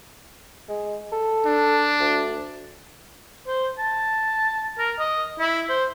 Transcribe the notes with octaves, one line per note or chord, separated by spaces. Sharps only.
G#3
A4
D4
D2
C5
A5
A#4
D#5
E4
C5